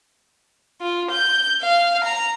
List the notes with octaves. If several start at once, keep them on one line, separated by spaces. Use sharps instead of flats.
F4
G6
F5
A#5